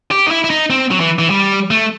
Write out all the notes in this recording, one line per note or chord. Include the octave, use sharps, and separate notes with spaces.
G4
D#4
E4
E4
D#4
C4
F#3
E3
E3
G3
A3